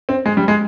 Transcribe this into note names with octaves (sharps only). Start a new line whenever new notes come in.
C4
G#3
G3
G#3